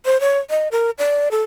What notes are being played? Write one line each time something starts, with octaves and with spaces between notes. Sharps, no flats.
C5
C#5
D#5
A#4
D5
A4